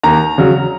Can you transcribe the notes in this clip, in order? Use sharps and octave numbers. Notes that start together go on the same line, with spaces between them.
D#2 A#5
C#3 F#3